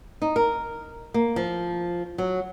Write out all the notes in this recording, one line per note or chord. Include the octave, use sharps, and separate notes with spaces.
D#4
A#4
A#3
F3
F#3